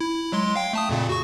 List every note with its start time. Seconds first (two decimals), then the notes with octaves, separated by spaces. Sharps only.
0.01 E4
0.32 F#3 G#3 C6
0.56 F5 G5
0.73 A3 A5 D#6
0.89 F2 A#2 C#3
1.09 F#4 C#6